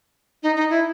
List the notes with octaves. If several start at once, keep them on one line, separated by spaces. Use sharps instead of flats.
D#4
D#4
E4